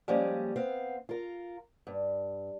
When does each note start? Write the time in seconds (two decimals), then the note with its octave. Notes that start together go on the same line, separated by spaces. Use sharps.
0.08 F3 G3 G#3 A#3 C#4
0.56 B3 C4 F5
1.09 F4 A#4
1.87 G2